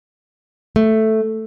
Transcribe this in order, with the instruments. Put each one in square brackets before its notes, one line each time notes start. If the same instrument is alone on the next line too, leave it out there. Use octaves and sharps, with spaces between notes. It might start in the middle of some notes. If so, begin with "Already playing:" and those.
[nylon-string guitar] A3